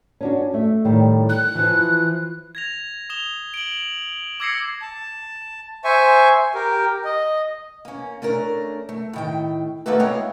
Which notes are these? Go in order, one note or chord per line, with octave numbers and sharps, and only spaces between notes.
C#4 D4 F#4
A3 E5
A2 D#3 G3
F#6
E3 F3
G#6 A#6 F7
D#6 E7 F7 G7
D7 F#7
D6 E6 G#6 A#6 C7 C#7
A5
C5 E5 G#5 C#6
G4 A#4
D#5
A#3 C#4
A3 C#4 D4 A#4
A3
A2 D#3 G5
A3 A#3 D#4 F#4 A4 B4
G#3 C4 E4 C#5 F5